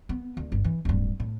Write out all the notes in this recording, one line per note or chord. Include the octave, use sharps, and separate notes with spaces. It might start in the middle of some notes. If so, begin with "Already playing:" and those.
B3
D2
G1
E3
D1 G2
A2